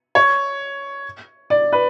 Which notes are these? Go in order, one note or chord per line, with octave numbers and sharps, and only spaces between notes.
C#5
D5
B4